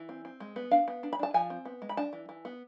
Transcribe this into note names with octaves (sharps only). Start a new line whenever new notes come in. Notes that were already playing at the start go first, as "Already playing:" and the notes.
Already playing: E3
C4
C4
G#3
B3
D4 F5
B3
D4
B5
D4 A5
F3 G#5
C4
B3
G#3
B5
D4 A5
E3
E3
B3